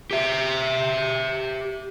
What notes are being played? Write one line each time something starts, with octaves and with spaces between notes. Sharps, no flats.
G4 E5